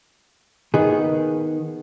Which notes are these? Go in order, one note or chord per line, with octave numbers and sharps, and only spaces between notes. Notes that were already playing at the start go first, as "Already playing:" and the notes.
D#3 B3 G#4